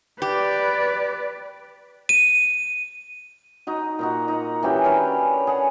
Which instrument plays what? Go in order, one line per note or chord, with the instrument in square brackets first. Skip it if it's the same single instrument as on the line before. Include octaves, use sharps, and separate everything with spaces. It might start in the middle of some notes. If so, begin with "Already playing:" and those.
[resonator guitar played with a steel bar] G4 [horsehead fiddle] B4 D5
[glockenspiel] D#7
[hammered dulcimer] D#4 F#4
A#2 D#4 F#4
D#4 F#5
E3 C#4 F#4 G4
C#4 D4 A#4 B4
G#4 F#5 A5